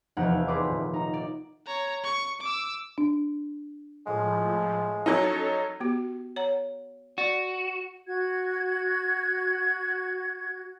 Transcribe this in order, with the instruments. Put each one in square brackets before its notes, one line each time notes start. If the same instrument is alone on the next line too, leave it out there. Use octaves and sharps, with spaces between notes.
[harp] F1 E2 D#4 E4 F#5
G#4 B4 D5 C6 D6 D#6
D#1
D#4 A#5
D5
[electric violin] C#5 A#5
C#6
D6 E6
[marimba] D4
[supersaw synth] A2 F3 [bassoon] G#3
[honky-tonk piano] F#3 D#4 [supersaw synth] C#4 A4 C#5
[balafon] B3 F#4 G4
C#5 F#5 A#5
[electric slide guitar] F#4 [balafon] D5
[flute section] F#4 G#6